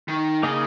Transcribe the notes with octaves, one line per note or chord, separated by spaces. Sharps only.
D#3
C#3 A#3 D#4 G#4 D#5